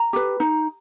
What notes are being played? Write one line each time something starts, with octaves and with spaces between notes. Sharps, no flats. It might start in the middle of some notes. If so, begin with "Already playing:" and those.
Already playing: A#5
G4 B4
D#4